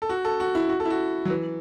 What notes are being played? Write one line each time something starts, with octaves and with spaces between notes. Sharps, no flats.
A4
F#4
A4
F#4
E4
F#4
A4
E4
F#4
F#3
E3